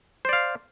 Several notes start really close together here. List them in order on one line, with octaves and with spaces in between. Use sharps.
C5 D5 F5